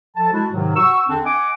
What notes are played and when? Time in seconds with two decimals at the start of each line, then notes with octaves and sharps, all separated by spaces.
0.17 F3 A4 A5
0.32 G#3 D4 E4 F#4
0.52 G#2 C3 D#3 F#3
0.76 F#4 C#6 E6
1.08 E2 D3 C4 D4
1.24 D#5 F#5 G#5 D6